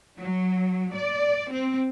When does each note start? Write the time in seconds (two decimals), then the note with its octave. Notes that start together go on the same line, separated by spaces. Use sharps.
0.20 F#3
0.94 D5
1.52 C4